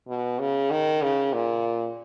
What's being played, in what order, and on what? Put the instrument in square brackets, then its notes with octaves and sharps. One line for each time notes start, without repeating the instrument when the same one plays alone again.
[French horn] B2
C#3
D#3
C#3
A#2